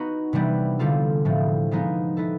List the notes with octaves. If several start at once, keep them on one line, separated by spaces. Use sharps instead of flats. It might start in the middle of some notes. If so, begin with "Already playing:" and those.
Already playing: B3 D#4 F#4
C3 E3 G3 B3 D4
D3 G3 C4 F4 A4
A2 F3 A3 C4
F3 G#3 B3 D#4 G#4
B3 E4 A4